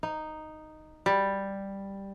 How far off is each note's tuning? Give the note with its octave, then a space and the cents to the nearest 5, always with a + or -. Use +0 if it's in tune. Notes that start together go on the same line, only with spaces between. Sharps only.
D#4 -5
G3 +5